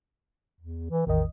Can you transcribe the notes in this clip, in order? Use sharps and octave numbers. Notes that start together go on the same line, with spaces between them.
E2
E3
A1 E2 D#3 D#5